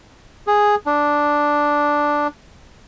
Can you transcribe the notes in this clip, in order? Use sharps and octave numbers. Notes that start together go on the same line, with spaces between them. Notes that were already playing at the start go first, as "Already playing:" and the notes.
G#4
D4